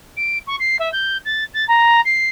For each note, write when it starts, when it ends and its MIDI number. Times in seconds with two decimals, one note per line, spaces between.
0.17 0.38 98
0.47 0.55 85
0.59 0.76 96
0.79 0.91 76
0.92 1.17 91
1.25 1.44 93
1.53 1.64 93
1.68 2.01 82
2.05 2.29 96